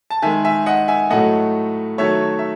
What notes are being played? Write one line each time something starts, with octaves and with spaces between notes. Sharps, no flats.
A5
D#3 G#3 E5 G#5
E5 G#5
D#5 F#5
E5 G#5
A2 F#3 A3 D#5 F#5
D#3 F#3 A3 C#5 E5
E5